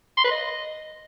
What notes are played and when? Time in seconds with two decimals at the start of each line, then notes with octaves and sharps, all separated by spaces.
0.17 C6
0.24 B4
0.31 D#5